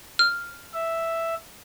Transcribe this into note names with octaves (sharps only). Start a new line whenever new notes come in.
F6
E5